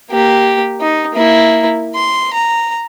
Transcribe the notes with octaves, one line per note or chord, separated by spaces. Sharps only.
A#3 G4
D#4
A#3 E4
C6
A#5